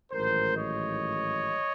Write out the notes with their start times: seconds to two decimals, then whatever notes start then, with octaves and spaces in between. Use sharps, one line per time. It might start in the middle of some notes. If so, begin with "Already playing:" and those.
0.12 A1 G#2 D#3 F#3 A#4 C5
0.57 C#5 D#5